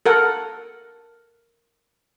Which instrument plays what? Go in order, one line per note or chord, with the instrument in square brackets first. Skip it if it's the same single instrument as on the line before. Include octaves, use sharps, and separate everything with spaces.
[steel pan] A4 A#4 F#5